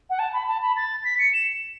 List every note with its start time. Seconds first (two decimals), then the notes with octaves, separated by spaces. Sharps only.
0.10 F#5
0.19 A5
0.33 B5
0.48 A5
0.62 B5
0.76 A6
1.04 B6
1.19 C#7
1.33 E7